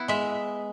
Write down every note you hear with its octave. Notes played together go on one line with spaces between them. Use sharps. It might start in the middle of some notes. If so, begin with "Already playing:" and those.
Already playing: B3 E4 F#5
G#3 E5